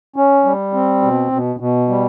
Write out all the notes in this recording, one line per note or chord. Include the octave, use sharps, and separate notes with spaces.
C#4
G3
C4
B2
B2
B2
G3